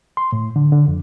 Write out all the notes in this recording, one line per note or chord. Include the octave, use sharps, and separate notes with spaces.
C6
A2
D3
D3
F2